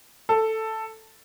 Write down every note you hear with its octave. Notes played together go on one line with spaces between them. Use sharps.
A4